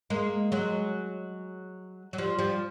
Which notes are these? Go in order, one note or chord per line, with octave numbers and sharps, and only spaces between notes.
G#3 A#3
F#3 G#3
F#3
F3 G3
F3 G3